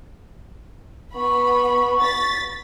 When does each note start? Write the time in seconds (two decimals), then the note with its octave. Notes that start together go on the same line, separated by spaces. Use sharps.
1.15 B3 B5 C#6
2.01 A6 B6